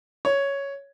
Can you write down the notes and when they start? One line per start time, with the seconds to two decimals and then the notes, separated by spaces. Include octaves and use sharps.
0.25 C#5